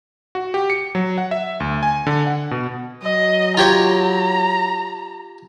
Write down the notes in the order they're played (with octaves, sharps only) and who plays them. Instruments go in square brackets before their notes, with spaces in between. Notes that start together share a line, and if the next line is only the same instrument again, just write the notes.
[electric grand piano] F#4
G4
C#7
F#3
F#5
E5
D2
G#5
D3
F#5
B2
[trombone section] F#3 [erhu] D#5
[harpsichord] F4 G4 C#5 [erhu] A#5